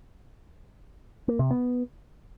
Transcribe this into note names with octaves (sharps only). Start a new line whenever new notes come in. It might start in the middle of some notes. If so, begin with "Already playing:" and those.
A#3
C3
B3